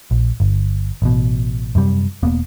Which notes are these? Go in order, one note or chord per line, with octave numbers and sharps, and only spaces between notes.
A#1
G1
A1 B2
F#2 C3 G3
E1 A#3 B3